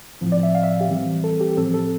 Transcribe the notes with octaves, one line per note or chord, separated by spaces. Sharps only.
A2 F3 C4
D5
E5
F5
E5
G4
E3 G3 C4
A4
G4
A2 F3 C4 A4
A4